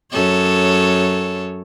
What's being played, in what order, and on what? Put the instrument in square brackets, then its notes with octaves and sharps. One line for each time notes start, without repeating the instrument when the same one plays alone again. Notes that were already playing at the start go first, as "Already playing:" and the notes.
[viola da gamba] F#2 A4 C#5